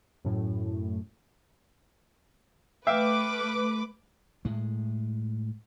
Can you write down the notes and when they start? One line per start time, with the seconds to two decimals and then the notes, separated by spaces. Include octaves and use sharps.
0.25 F#2 A2
2.87 A3 B4 E5 F5 G5 D6
4.45 A2 G#3